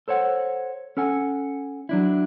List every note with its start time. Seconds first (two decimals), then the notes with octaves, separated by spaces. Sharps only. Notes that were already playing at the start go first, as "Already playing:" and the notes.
0.08 A4 C5 C#5 F#5
0.97 C#4 A4 F#5 G#5
1.89 F#3 D4 E4